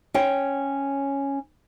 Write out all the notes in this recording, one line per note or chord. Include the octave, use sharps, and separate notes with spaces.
C#4 C#5 G5